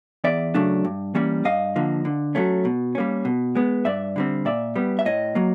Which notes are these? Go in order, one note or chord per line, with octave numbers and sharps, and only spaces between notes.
E2 D5 E5
C#3 F#3 A3 D4
G2
E3 G3 A#3 C#4
G2 D#5 F5
D3 F3 A#3
D3
F#3 A3 C#4
B2
G3 A#3 C#4
B2
G#3 B3
G2 D5 E5
D3 G3 C4
A#2 D5 E5
G3 B3
E5
A2 C#5 D#5
F#3 A#3